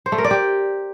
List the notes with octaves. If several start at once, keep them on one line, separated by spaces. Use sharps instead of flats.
C5
A3
A#4
D5
G4